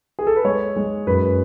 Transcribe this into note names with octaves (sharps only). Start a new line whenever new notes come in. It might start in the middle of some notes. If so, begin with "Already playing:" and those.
G#4
A4
B4
G#3 C#5
G#3
F#2 B4